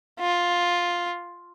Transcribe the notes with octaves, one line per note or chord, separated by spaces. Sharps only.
F4